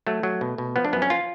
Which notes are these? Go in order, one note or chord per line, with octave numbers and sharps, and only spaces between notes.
F#3 A3
F#3
B2
B2
F3 B3
D4
F#2 B3
C#4
F4